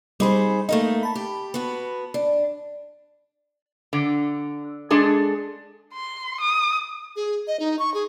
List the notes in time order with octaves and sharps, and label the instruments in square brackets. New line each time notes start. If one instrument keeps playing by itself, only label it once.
[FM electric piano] G3 C4 B5 [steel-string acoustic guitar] D#4 G#4 C5
[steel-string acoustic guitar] A3 A#3 D#4 [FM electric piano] D#5
[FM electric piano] A5 B5
[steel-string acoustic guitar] G4
B3 F#4
D4
[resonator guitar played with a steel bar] D3
G#3 D4 G#4 A4
[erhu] C6
D#6
[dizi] G#4
D#5
D#4
C#6
G#4